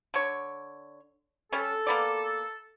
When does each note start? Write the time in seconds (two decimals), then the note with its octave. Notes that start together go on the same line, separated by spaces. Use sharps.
0.14 D3 C#5
1.53 G3 C#4 A4
1.87 A#3 B3 D5